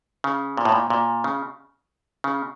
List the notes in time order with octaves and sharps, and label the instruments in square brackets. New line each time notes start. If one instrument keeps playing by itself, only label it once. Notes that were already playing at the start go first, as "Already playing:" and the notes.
[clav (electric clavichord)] C#3
A#2
A2
A#2
A#2
C#3
C#3